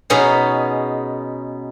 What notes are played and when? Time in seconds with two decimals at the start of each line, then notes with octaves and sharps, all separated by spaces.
0.10 B2 B3 C#4 D#4 G#4